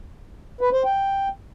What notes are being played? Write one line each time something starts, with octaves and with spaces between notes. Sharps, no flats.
B4
C5
G5